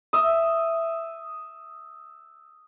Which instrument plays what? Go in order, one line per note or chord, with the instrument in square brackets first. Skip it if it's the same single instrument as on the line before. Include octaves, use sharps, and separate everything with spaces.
[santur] E5 D#6